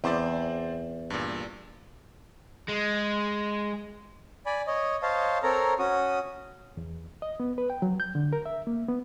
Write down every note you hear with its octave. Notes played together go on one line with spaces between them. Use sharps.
E2 C4 C5 D5
G2 A#2
G#3
D5 G#5 B5
C#5 D#5
C5 C#5 D#5 F5 A5
C4 A4 A#4 C#5 A#5
C#4 F#4 D#6
E2
D#5
B3
B4
G5
F#3
G6
D3
A#4
E5
A#3
B3